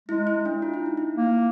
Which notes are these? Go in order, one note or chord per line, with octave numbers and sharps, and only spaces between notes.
G#3 E4
E4
D4
F4
E4
D#4
E4
A#3